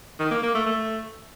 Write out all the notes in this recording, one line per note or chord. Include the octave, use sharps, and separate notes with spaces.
D#3
A#3
A#3
A3
A3